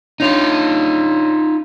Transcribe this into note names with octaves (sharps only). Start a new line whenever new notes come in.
D4 D#4 F4 C#5 F7